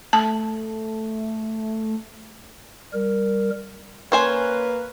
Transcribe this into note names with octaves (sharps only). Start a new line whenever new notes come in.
A3 A5
G3 A#4
A#3 C#4 B4 C5 G#5